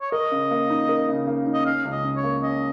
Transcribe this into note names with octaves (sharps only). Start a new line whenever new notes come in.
C#5
A#4 D#5
C#3
A#3
D#4
A#4
C#3
A#3
D#4
D#5
C#4 F5
C#2
D#5
C#3
C#5
A#3
C#4 D#5